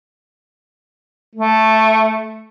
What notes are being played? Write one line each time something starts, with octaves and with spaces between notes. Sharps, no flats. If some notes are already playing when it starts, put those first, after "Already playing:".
A3